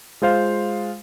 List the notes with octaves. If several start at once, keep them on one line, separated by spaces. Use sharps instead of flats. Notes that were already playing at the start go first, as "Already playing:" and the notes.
G#3 F4 C5 F5